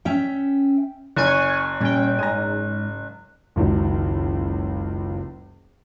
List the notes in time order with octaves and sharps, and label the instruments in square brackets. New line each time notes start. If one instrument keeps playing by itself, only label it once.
[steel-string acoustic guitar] C#4 E5 G5
[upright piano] F#1 [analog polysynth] G#5 C#6 [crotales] F#6
[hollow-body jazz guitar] A#2 G3 [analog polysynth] C#4 G5
[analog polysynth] G#2 [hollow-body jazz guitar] G#5 A#5
[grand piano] F#1 C#2 D#3 F#3